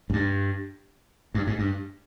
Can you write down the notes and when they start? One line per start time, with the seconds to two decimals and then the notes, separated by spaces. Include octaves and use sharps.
0.10 G#2
0.13 G2
1.35 G2
1.47 G#2
1.59 G2